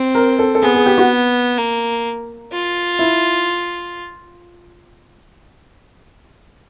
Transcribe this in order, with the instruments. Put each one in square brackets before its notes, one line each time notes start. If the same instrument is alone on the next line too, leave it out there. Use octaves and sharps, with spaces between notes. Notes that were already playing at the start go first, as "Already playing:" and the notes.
Already playing: [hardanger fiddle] C4
[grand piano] A#4
A4
A4
[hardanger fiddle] B3 [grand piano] G#4
[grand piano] G#4
G4
F#4
[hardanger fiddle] A#3
F4
[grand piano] E4